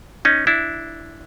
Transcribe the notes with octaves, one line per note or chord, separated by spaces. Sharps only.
C#4 D#4
D4 E4